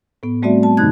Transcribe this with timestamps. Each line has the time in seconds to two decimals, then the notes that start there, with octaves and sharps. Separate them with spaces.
0.23 A2 B3
0.43 G3 A3 C4 F#4 D5 E5
0.63 A5
0.77 G2 C3 D#3 D#4 F#6 G#6